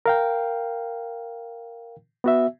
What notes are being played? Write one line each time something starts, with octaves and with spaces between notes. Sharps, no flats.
A#4 F5 G5
B3 F#4 E5